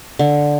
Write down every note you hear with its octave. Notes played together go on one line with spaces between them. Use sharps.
D3